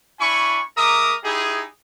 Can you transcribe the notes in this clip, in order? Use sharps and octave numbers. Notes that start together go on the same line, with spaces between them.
D4 E4 G#5 B5 C#6
G#3 A#4 E5 A#5 D6 D#6
D#4 E4 G4 G#4